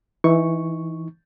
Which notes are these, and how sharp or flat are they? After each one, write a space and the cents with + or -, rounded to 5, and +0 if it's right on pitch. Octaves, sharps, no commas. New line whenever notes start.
E3 +0 D#4 +20 C#6 +0